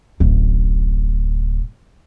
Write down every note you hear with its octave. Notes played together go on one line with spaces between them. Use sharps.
D1 A1